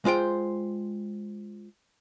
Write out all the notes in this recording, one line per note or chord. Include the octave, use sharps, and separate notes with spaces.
G#3 F4 C5 G5